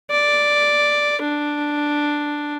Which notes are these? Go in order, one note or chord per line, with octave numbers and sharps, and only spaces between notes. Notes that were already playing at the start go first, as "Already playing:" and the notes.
D5
D4